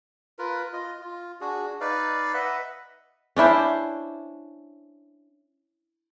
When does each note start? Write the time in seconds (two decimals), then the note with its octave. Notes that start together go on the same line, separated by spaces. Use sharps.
0.39 F4 A#4 B4
0.73 F4 D#5
1.02 F4
1.41 D4 F#4 G#4
1.81 D#4 B4 D5 F5
2.34 B4 D#5 E5 F#5
3.36 C#4 D4 E4 C5